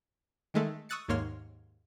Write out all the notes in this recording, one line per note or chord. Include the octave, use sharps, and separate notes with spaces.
D#3 G#3 A3
C#6 D#6 E6 F#6 A6 C#7
D#2 G#2 A#3 C#5 C6 F6